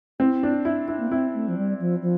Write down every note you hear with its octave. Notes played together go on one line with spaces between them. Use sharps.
C4 E4
D4
D4 E4
E4
A#3
C4 E4
A3
F3
G3
F3
F3